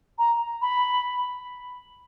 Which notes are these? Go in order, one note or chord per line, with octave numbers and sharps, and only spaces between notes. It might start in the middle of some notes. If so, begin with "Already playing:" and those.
A#5
B5